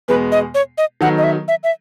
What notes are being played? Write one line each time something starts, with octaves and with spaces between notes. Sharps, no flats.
E2 B2 G#3 B3 B4
D#5
C#5
D#5
D#3 F#3 B3 D#4 A4 F#5
D#5
E5
E5
E5